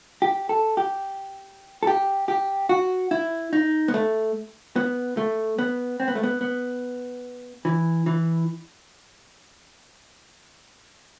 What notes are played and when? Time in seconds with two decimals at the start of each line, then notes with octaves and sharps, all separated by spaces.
0.22 G4
0.49 A4
0.77 G4
1.83 A4
1.87 G4
2.28 G4
2.69 F#4
3.11 E4
3.53 D#4
3.88 B3
3.94 A3
4.76 B3
5.17 A3
5.59 B3
6.00 C4
6.08 B3
6.15 A3
6.23 B3
6.41 B3
7.65 E3
8.06 E3